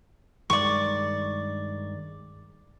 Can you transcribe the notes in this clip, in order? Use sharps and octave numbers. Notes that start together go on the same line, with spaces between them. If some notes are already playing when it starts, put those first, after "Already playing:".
G2 D#3 G#3 D5 C#6